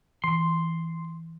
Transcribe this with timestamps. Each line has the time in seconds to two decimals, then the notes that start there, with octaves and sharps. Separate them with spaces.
0.24 E3 C6